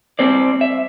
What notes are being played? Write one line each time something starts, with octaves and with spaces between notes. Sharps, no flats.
C4 C5 D5
E5